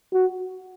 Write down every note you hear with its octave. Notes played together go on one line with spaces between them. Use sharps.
F#4